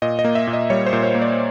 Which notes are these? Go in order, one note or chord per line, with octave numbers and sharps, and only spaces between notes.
A#2 D#5
D#5
A#3
E5
A#2
D#5
G3 C#5
C5
A#2
C#5
A#3
D5